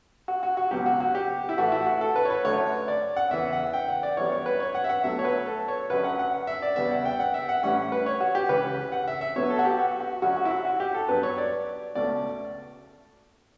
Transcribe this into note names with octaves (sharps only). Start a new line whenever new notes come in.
F#4
F#4
F#4
C#2 B2 F#3 G4
F#4
F#4
G4
E4
A2 E3 A3 F#4
E4
F#4
A4
B4
C#5
B4
F#2 D3 A3 C#5
D5
F#5
E2 C#3 E3 E5
F#5
G5
F#5
D5
F#2 E3 G3 B3 C#5
C#5
B4
C#5
F#5
E5
F#5
B2 F#3 A3 E5
C#5
B4
A4
C#5
F#2 D3 F#3 C#4 B4
F#5
F#5
E5
D5
E2 C#3 G3 B3 E5
F#5
G5
F#5
E5
F#5
A2 E3 G3 C#4 F#5
B4
C#5
F#4
G4
C#2 C#3 E3 B4
F#5
E5
E5
B2 F#3 B3 C#5
A4
F#4
G4
F#4
F#4
F#2 D3 F#3 C#4 F#4
F#4
E4
F#4
F#4
G4
A4
G2 F#3 B3 B4
C#5
D5
C#2 B2 A3 C#4 D5